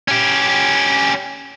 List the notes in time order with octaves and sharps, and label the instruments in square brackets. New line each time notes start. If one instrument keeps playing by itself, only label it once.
[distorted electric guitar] C#4 G4